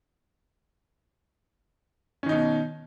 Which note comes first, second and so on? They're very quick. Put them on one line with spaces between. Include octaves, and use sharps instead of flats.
C#4 D#3 D#4 B2